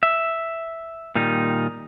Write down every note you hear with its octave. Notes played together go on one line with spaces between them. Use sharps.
E5
A#2 D#3 G3 D#4